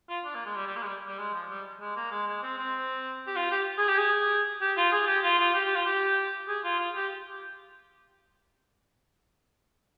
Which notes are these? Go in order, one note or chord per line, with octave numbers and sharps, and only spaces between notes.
F4
D4
A#3
G#3
G3
G3
A#3
G#3
G3
G3
G#3
F3
G3
G#3
A#3
G#3
G#3
C4
C4
G4
F4
G4
G#4
G4
G#4
G4
F4
G#4
G4
F4
F4
G4
G4
F4
G4
G#4
F4
F4
G4